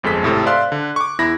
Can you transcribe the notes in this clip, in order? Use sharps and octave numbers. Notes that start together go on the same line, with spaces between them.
G1 F2 G#3 A4 B6
G#1 A2 C3 A4
C5 D5 E5 F5 C6 F#6
D3
C#6 D6
E2 E4 B5 A#6